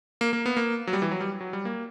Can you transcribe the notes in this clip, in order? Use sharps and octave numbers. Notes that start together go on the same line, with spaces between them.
A#3
A#3
B3
A#3
F#3
G3
E3
F#3
G3
F#3
G3
A#3